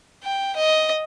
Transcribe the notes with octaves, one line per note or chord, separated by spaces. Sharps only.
G5
D#5